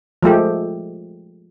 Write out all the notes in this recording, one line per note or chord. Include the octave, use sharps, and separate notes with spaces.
F3 G#3 A3 G4